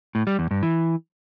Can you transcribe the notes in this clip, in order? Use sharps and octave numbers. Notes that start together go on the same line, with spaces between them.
A2
G3
E2
G2
E3